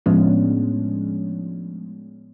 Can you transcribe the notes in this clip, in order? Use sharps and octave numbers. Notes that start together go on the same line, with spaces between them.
A2 F3 G#3 B3 C#4 D4